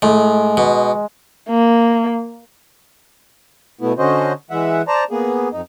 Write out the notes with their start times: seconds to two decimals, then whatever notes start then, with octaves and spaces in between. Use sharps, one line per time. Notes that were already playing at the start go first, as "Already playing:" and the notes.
0.02 A2 G#3
0.57 B2
1.49 A#3
3.81 B2 A3 B3 E4
3.98 D3 C#4 F#4 C5 D#5
4.51 E3 G#3 E5 F#5
4.88 C5 D5 A5 A#5
5.11 A#3 B3 G#4
5.52 F2 D#4